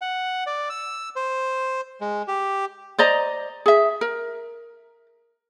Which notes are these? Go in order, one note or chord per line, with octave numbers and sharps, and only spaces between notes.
F#5
D5
E6
C5
G#3
G4
C5 D5 D#5 A#5
G#4 E5
A#4